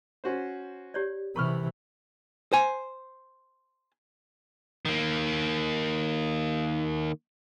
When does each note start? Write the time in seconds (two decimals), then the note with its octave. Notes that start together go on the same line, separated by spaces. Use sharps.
0.24 C#4 F#4 C5
0.94 G4 C#5 D5
1.36 C3 E3 A#4 B5 C#6 F6
2.53 C5 G#5
4.85 D#3 A#3